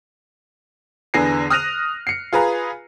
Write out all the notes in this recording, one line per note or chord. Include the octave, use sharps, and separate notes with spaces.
E2 D3 B3 G#5 A#6 C7
D#6 F6 F#6 A#6 D#7 F7
C7 C#7
F4 G#4 B4 A#5